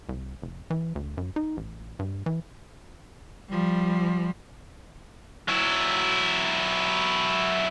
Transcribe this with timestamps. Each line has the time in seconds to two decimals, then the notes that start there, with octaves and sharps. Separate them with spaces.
0.09 C2
0.42 F1
0.70 E3
0.95 D2
1.17 F#2
1.36 D#4
1.57 A1
1.99 G2
2.26 E3
3.50 F3 G3
5.49 F#3 E4